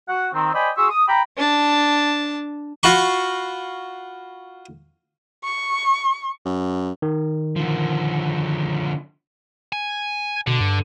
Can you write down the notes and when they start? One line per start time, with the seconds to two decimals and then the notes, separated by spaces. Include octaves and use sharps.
0.09 F#4 F#5
0.34 D#3 C4
0.54 C5 D5 D#5 G5 G#5 B5
0.77 F#4 G#4 C6 C#6 E6
0.90 D#6
1.08 G5 A#5 B5
1.37 D4 A5
2.83 F4 F#4 B5 C#6
5.44 C#6
6.45 F#2
7.02 D#3
7.56 D3 F3
9.72 G#5
10.47 B2 D3
10.60 G2